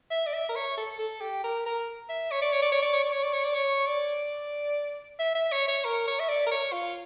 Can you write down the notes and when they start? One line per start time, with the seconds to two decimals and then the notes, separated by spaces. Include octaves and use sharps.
0.11 E5
0.26 D5
0.33 E5
0.49 A#4
0.56 C#5
0.77 A4
0.99 A4
1.21 G4
1.44 A#4
1.66 A#4
2.09 E5
2.31 C#5
2.42 D5
2.52 C#5
2.62 D5
2.72 C#5
2.82 D5
2.93 C#5
3.03 D5
3.12 C#5
3.23 D5
3.33 C#5
3.44 D5
3.54 C#5
3.87 D5
5.19 E5
5.35 E5
5.52 C#5
5.68 C#5
5.85 A#4
6.08 C#5
6.20 E5
6.28 D5
6.47 A#4
6.51 C#5
6.73 F4